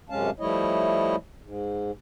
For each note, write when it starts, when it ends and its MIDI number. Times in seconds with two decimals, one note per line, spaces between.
0.10 0.30 42
0.10 0.30 48
0.10 0.30 56
0.10 0.30 61
0.10 0.30 77
0.10 0.30 81
0.39 1.16 53
0.39 1.16 55
0.39 1.16 57
0.39 1.16 64
0.39 1.16 73
0.39 1.16 75
1.42 1.91 44